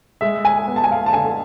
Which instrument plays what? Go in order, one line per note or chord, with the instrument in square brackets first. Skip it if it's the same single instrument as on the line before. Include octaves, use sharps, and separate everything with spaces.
[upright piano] G#3 E5
G#5
B3
A5
G#5
F5
A5
D3 G#5